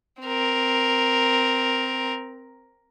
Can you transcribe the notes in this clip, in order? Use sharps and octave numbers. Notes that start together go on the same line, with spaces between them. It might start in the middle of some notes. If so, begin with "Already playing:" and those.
C4 A#4